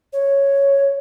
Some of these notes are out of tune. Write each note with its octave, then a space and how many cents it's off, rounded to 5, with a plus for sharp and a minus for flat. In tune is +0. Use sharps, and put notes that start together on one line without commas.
C#5 +0